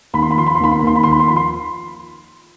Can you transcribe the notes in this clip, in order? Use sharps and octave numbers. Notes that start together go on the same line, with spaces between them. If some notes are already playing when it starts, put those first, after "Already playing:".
D#2 B5
C6
B5
F3 C6
B5
C6
D#2 B5
C6
B5
D#2 C6
B5
C6
D#2 B5
C6
F3 B5
C6